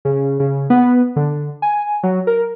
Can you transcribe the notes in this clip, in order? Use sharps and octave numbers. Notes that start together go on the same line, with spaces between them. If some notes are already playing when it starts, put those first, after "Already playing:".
C#3
C#3
B3
D3
G#5
F#3
A#4